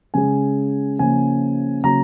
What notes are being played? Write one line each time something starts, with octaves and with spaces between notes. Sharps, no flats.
C#3 G#3 G#5
C#3 F3 A#3 G#5
C#3 F#3 A#3 A#5